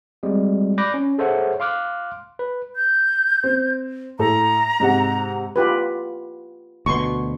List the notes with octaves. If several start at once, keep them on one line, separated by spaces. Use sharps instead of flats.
G3 G#3 C4 F#4
D5 B5 D6 F#6 G6 A#6
C#4
G#4 A4 C5 C#5 E5 F#5
F5 C6 D6 F6 F#6
B4
G6
C4
A2 A4 A#5
G#2 C3 F#5
F4 G4 B4
D2 B2 C6 C#6